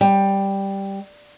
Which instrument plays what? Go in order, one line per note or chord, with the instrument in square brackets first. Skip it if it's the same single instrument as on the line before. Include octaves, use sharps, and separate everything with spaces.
[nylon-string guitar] G3